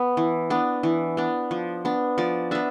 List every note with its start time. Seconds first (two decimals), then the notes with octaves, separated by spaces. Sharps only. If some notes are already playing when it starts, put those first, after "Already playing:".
Already playing: B3
0.17 E3
0.50 B3 D4
0.83 E3
1.17 B3 D4
1.51 F3
1.85 B3 D4
2.18 F3 D5
2.51 B3 D4 E5